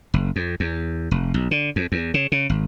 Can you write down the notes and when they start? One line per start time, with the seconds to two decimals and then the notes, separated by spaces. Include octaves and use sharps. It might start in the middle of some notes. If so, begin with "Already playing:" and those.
0.14 F#1
0.36 F2
0.60 E2
1.11 F1
1.34 B1
1.51 D3
1.76 F2
1.92 E2
2.14 C#3
2.32 C#3
2.49 G#1